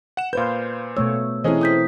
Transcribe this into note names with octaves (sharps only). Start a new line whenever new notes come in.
F#5 E7
A#2 B4 C5 F5 G6
B2 A3 C#5 E6
E3 C4 C#4 E4 G#4 A4 C5 D#5
D#6 G6 B6